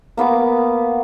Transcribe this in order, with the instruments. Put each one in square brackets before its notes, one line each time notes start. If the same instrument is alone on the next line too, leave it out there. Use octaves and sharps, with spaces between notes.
[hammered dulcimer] A#3 B3 C#6 D6